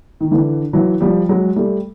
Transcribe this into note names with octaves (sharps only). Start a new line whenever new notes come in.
D#3
D3 E3
E3 F#3
F3 G3
F#3 G#3
G3 A3